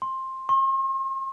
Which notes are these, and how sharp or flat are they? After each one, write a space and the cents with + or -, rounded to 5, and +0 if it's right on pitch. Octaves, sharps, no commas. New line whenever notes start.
C6 +15
C6 +45